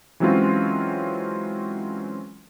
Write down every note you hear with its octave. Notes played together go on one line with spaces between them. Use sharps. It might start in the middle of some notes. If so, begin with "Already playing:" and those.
E3 F#3 G#3 C4 C#4 F4